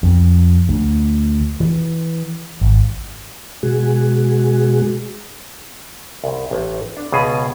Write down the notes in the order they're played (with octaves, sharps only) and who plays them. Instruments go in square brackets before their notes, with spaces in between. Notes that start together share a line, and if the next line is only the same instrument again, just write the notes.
[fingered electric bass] F2
D2
E3
G#1
[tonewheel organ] B2 G#3 F#4 G#4
[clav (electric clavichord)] C2
A1
D4
C#2 B2 G#4